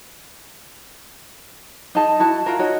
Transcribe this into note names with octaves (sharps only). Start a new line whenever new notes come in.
D#4 G#4 D#5 A5
E4 F#4 A5
F4 F#4 A#4
D#4 F#4 C#5